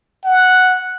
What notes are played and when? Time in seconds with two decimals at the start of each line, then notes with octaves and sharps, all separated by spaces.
0.25 F#5